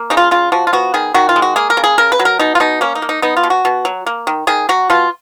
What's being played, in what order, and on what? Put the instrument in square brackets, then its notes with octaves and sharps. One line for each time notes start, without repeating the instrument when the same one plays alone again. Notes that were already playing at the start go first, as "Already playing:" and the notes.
Already playing: [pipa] A#3
C#3 D#4
F4
C#3 F4
F3 F#4
F4
B3 F#4
D#3 G#4
D#3 F#4
F4
G#3
F#4
A#3 G#4
A#4
C#3
G#4
C#3 A#4
B4
F#3
A#4
B2 D#4
F4
B2 D#4
A#3 C#4
D#4
A#3
D#4
B3 D#4
F4
B2
F#4
B2
F#3
A#3
D#3
D#3 G#4
F#3 F#4
B2 F4